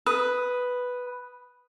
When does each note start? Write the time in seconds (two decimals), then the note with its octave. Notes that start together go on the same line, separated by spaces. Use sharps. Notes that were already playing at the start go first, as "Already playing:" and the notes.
0.06 B4 D#6